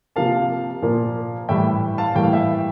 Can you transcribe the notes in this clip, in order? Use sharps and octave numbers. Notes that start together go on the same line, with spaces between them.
C3 F3 A#3 F5 A5
A#2 F3 A#3
A2 E3 G3 E5 G5
F5 A5
A2 E3 G3 A#3 G5
F5
E5 G5